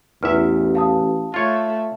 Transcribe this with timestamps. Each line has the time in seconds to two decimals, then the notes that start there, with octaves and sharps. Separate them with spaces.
0.23 A1 E2 E4 B4 E5 F6
0.75 F5 A5 D#6
1.34 A3 F4 C#5